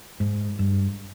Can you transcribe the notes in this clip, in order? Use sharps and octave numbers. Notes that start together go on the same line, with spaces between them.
G#2
G2